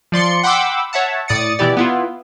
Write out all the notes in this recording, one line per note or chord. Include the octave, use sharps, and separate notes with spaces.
F3 D5 C6 C#7
F#5 G5 B5 C6 D6 E6
C#5 E5 F#5 A5
A2 D5 D#6 A6 C#7
B2 E3 E4 G4 D5
B3 E4 F4